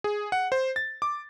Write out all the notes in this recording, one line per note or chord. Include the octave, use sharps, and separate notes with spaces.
G#4
F#5
C5
A6
D6